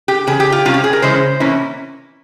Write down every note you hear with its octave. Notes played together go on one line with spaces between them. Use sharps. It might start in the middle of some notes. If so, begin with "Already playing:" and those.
G4
E2 C#3 G#4
G4
F4
C3 G3 C#4 F4
G4
G#4
A#4
C#3 E3 G#3 C#4 E4 C5
C3 E3 A#3 C#4 E4